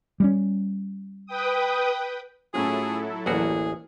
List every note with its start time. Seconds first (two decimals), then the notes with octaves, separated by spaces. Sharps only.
0.20 G3 A3 C#4
1.26 B4 G5 D#6
2.54 A2 F#3 C#4 E4 F4 G#4 A4
3.26 A1 D2 E3 A#3 F#4 G#4